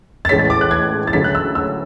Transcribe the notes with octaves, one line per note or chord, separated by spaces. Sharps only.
A6
A1 A2 G#3 C#4 B6
A6
D6
F#6
G#6
A6
D2 C#3 F#3 B6
F#6
E6
E6